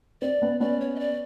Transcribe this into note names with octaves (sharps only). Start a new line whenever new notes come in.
C4 D5
B3 C#4
B3 C#4 D5
C#5
D#5
D5